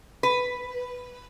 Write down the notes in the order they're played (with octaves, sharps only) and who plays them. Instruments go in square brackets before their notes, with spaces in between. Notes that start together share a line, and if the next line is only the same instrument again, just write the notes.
[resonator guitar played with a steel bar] B4